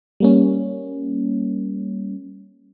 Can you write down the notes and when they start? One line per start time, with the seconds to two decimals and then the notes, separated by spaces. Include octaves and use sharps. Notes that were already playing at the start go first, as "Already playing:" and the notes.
0.20 G3 A#3 C#4